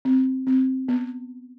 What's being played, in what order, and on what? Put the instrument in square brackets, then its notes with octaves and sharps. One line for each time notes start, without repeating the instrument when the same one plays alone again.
[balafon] C4
C4
B3